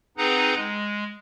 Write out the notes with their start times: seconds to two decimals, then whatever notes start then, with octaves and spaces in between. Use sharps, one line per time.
0.17 C4 D#4 G#4 B4 F#5 A#5
0.56 G#3